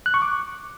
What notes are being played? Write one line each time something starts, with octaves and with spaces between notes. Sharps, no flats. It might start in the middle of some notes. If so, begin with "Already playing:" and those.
F#6
C#6
D6